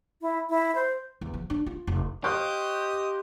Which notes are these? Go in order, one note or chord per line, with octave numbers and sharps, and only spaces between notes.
E4
E4
C5
E2
F3
D4
F4
F1
G4 C5 D#5 F5 C#6 F#6